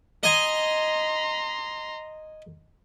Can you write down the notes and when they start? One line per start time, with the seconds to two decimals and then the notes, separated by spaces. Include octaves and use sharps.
0.23 D#5 G#5 A#5 C6